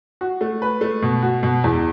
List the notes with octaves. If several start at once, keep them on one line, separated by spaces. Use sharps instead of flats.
F#4
A3
B4
A3
B2
F#4
B2
E2